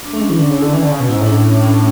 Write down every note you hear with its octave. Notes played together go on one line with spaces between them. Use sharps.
D4
A3 C#4
G#3
E3 C#4
D3 D4
C#3
E4
D3
E3 C#4
D3
C#3
B2
G#2 E4
A2
G#2 D4
A2
C#4
D4
C#4